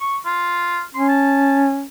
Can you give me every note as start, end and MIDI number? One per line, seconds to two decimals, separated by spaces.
0.01 0.17 85
0.25 0.82 65
0.94 1.85 61
0.94 1.05 84
1.08 1.63 81